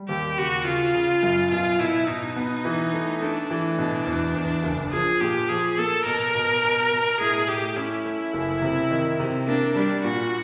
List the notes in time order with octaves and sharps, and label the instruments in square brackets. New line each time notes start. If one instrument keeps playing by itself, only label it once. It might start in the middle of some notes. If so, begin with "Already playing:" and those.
Already playing: [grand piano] G3
[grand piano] D#2 [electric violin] G4
[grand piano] C#3 [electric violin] F#4
[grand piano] C#3 [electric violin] F4
[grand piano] C#3
F#2
[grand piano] B2 [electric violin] F4
[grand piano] B2 [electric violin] E4
[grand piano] B2 [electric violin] D#4
[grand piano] B3
E3
A3
[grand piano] A3 [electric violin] D4
[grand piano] E3
[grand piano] B2 [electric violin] D4
[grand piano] E2
E2
F#1
[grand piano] F3 [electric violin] G#4
[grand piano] A#2 [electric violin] G4
[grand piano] F3 [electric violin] G#4
[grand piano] A#3 [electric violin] A4
[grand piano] B2 [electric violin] A#4
[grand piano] B2
B2
B2
[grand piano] A2 [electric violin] G#4
[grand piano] A3 [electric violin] G4
[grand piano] C#4 [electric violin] E4
[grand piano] A3
F#1
C3
D#3
C3
[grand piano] A#3 [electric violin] D4
[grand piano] G3 [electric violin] D4
[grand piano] A#2 [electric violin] F#4